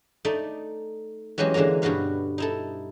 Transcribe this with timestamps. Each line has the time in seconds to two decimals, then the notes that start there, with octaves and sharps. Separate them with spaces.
0.25 A3 D#4 D5
1.38 E3 F#3 G#3 C#4 G4 G#4
1.54 D3 E3 G#3 A#3 A#5
1.82 G2 B2 F#4 B4 F5
2.38 D#4 E4 A4